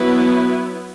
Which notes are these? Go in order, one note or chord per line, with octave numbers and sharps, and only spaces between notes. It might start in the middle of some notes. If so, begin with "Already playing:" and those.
Already playing: F#3 B3 E4 B4